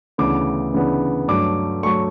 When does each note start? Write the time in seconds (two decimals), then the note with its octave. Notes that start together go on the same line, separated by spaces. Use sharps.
0.18 D2 C#3 E3 B3 D4 D6
0.74 D2 C#3 E3 B3 D4
1.28 G2 F#3 A3 D6
1.83 F#3 A3 C#6